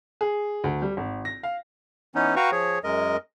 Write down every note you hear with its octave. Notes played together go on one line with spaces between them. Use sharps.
G#4
D2
G3
G#1
A#6
F5
E3 B3 C#4 D#4
F#4 B4 F5 G5 A#5 C#6
F3 G#4 C#5
F#2 G#3 A#4 D#5